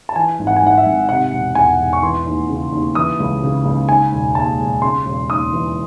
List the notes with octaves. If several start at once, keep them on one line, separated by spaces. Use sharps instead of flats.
A5
E3 G#5
G#1
F#5
G#5
G#2 F#5
E5
G#1
C3 F#5
E1
E2 G#5
E1
C#6
E3 C6
D#2
C#3
D#2
E3 D#6
C#2
C#3
C#2
D#3 G#5
E1
D#2 A5
E1
C#3 C6
E1
D#2 D#6
E3